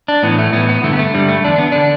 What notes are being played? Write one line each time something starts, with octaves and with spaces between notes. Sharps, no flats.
D4
A2 E3 B3
A3
A2 E3 B3
B3
G2 D3 A3
B3
A3
G2 D3 G3
A3
E2 D3 D4
B3
D3 D4